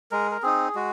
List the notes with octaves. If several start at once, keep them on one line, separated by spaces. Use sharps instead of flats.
G#3 A#4
A#4
C4 D#4 G#4
G#3 F#4